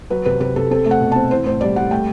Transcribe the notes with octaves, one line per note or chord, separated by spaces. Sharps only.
F#3 B4
C3 B4
C3 B4
C3 A4
C4 A4
A3
F#5
B2
C4 A5
E3 C5
A2 C5
G3 D5
G3 F#5
A3 G5